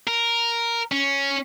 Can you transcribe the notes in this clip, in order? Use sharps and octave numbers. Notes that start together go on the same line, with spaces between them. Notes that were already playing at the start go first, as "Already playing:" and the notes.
A#4
C#4